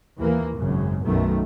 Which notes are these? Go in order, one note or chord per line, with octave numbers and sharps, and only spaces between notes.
D#2 E3 A#3
G#1 F#2 C#3
B1 F#2 B2 D#3 A3